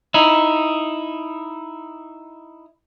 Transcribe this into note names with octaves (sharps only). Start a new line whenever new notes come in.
D#4 E4